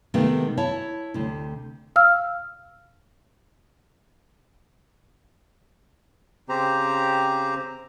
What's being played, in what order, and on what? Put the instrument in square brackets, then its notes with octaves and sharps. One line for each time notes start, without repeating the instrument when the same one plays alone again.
[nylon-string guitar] C3 D#3 G#3 A3 B3
E4 C#5 A5
D2 C3
[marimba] F5 E6 F6
[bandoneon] C#3 C4 G4 C5 A#5